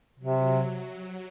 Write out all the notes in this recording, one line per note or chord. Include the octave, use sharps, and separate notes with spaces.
C3 F#3